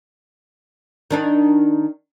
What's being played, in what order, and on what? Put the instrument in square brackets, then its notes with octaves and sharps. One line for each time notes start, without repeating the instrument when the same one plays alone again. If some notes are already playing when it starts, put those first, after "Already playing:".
[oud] D#3 D4 D#4